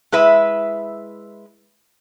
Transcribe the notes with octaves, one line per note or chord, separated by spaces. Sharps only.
G#3 E4 B4 E5